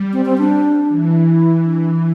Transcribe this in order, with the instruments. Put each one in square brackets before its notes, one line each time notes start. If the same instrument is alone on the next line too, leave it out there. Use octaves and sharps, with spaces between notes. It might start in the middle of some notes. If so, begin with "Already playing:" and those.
Already playing: [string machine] G3
[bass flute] C4
C4
D4
[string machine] E3
[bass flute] E4
D4